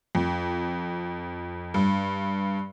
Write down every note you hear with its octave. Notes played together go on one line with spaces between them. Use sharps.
F2
G2